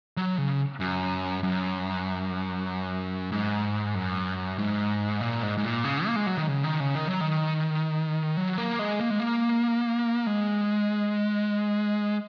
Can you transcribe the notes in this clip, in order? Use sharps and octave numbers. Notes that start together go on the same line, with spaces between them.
F#3
C#3
F#2
F#2
G#2
F#2
G#2
A#2
G#2
G#2
A#2
C#3
A#3
G#3
F#3
D#3
C#3
D#3
C#3
D#3
F#3
D#3
F#3
A#3
G#3
A#3
G#3
A#3
G#3